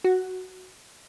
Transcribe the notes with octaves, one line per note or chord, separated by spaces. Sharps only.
F#4